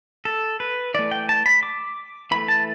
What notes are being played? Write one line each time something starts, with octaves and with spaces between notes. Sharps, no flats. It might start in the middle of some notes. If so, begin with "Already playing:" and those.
A4
B4
E3 A3 D5
G5
A5
B5
D6
E3 A3 B5
A5